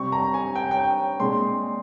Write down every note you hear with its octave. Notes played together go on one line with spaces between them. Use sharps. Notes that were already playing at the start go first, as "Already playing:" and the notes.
Already playing: C3 G3 C4 C#6
A#5
G#5
G5
G5
A#2 G#3 C4 C6